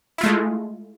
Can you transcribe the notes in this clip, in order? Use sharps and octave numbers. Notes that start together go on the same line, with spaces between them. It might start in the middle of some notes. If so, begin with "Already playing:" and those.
G#3 A3 E4 F4